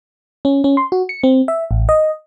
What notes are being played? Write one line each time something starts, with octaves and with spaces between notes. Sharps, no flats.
C#4
C#4
C6
F#4
C#7
C4
E5
A1
D#5